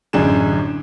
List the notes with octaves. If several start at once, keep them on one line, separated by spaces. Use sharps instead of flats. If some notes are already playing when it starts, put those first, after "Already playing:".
A1 F#2 D3 G#4 E7